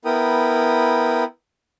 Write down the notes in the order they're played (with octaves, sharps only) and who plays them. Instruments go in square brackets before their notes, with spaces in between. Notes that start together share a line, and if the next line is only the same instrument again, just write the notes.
[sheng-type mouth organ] B3 E4 A#4 G5 D#6